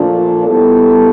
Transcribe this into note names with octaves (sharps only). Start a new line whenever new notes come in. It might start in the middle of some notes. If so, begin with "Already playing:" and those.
Already playing: A#2 F3 A3 D4 F4
G3 B3 E4 A4